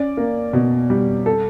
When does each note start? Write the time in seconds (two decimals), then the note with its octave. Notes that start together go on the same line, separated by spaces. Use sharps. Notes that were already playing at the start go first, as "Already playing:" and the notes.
Already playing: C#4 D5
0.17 A#3
0.53 B2
0.90 G3
1.26 A4